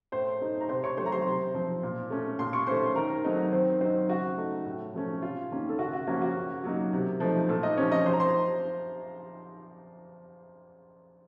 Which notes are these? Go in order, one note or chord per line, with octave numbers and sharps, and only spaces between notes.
A2 C5 C6
A3 D#4
A#5
C3 C5 C6
C#5 C#6
F#3 A3 C5 C6
A#5
C5 C6
C3
F3 C4
A#2
A3 C#4
A#2 C6
C#6
A3 C#4 C5 C6
D#3 A#4 A#5
F#3 A3 C4 D#4
D#3 C4 C5
F#3 C4 D#4 C5
C#3 F#4
A3 D#4
A2
F3 A3 C#4
C3 F4
D#3 A#3 C#4
A4
C#3 F#4
F#4
F3 A#3 C#4 F#4
F#4
C#3
F#3 A#3 D#4
C3
F3 A3 D#4
A#2 A3 A4
D#4 D#5
F3 C4 C#4 C#5
D#4 D#5
F3 C5 C6
A#5
C5 C6